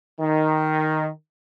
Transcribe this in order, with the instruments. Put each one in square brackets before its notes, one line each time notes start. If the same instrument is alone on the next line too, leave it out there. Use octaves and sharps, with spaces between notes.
[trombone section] D#3